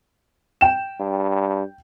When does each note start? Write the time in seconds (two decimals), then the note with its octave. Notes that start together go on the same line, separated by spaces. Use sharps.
0.61 G5 E7
1.00 G2